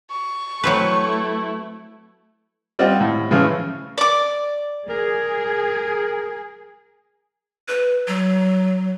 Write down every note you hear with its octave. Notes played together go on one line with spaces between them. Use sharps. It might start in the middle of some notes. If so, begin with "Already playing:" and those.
C#6
F#3 A3 C4 E4 B4
G3 C4 F4 D#5 F#5
A2
A2 C#3 E3 F3 C#4 F4
D5 D6
G#4 A#4
B4
F#3